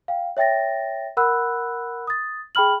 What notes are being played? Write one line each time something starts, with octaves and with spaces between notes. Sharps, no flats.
F5 G5
C#5 E5 G5 A6 A#6
A#4 F#5 B5 E6 F#6
D#6 A6
G#4 G5 B5 F6 F#7